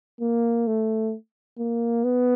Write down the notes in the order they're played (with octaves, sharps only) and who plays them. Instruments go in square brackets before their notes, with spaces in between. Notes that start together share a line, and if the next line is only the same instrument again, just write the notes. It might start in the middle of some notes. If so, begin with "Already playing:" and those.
[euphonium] A#3
A3
A#3
B3